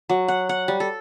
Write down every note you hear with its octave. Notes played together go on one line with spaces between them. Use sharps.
F#3
F#5
F#5
G3
A4